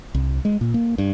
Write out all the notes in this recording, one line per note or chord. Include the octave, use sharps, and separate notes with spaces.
C2
G#3
A#2
A#3
G2